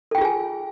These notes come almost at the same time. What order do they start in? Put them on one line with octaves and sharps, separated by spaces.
A4 G5 F4 G#4 G#5